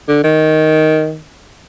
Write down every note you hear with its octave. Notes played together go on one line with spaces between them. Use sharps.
D3
D#3